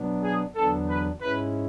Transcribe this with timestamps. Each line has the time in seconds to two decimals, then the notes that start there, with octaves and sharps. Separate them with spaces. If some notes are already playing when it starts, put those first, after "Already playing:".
Already playing: B2 F#3 B3 D4
0.22 G#4
0.56 E2 D3 F#3 B3 D4 A4
0.88 B4
1.21 G#2 G#3 C#4 E4 B4